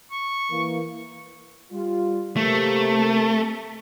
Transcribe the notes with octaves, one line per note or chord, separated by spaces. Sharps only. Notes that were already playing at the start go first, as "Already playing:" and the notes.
C#6
E3 A#3
G3 F4
C3 A3 A#3